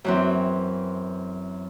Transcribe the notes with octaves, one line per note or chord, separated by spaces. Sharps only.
F#2 E3 C4